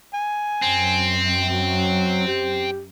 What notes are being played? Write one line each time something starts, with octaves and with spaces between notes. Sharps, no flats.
G#5
F#2 C4
F#3
G4